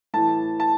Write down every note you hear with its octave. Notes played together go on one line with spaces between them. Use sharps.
A2 E3 A5
A5